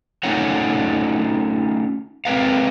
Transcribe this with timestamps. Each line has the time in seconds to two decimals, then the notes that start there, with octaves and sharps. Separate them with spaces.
0.23 A3 C#4 D#4 F4 C#5 F#5
2.25 G#3 C4 B4 F5